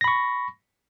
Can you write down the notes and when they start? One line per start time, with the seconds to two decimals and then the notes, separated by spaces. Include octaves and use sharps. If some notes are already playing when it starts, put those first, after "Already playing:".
0.01 A#6
0.04 B5
0.08 C#6